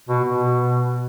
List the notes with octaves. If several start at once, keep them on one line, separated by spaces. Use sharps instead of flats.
B2
B2